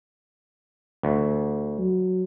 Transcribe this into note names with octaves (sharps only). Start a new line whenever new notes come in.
D2
F#3